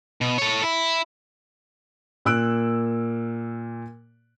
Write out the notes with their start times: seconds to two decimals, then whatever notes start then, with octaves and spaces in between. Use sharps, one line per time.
0.21 B2
0.38 A4 C#5
0.63 E4
2.25 A#2 A#3 E6 F#6 D7